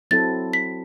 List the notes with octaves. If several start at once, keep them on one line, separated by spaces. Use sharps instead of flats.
F#3 C4 E4 A4 A6
B6